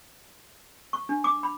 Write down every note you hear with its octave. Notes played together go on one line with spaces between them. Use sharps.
C#6
D4
D6
B5